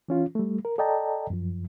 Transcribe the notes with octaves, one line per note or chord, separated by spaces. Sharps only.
E3 C#4 F4
G3 A3
A#4
A4 D5 D#5 G5 A5 A#5
F#2 F3